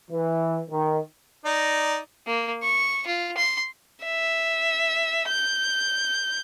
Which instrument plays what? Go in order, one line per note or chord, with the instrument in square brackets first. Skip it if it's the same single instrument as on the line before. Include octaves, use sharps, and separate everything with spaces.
[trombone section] E3
D#3
[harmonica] D#4 D5
[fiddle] A#3
C#6
F4
C6
[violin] E5
G6